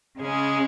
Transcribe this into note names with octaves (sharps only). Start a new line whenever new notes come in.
C#3 G#3 C#4 G#4